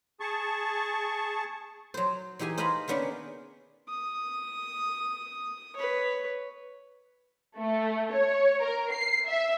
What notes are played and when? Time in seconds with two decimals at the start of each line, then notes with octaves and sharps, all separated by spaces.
0.20 G#4 A5 C#6
1.94 F#3 C5
2.39 E3 D#4 G4 G#4 G#5
2.58 C5 D#5 F5 G#5 A#5 B5
2.88 D#3 A#3 B3 C#4 D4
3.89 D#6
5.76 B4 C#5
7.58 A3
8.13 C#5
8.63 A#4
8.93 C7
9.26 E5